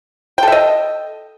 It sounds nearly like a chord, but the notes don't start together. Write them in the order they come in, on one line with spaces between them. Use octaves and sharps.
G5 A4 E5 D#5